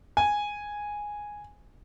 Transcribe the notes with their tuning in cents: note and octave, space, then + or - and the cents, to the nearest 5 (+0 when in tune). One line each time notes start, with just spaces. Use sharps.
G#5 -5